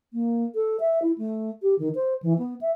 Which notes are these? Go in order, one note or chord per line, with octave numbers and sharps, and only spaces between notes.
A#3
A4
E5
E4
A3
G4
D#3
C5
E3
B3
E5